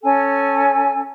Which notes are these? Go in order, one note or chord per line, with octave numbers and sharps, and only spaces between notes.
C#4 A4 G#5